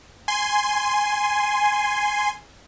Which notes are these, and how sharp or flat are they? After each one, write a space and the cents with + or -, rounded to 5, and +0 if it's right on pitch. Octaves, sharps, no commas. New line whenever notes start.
G#5 +0 C6 -5